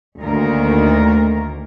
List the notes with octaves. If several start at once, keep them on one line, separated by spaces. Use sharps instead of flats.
D2 D#3 A#3 A#4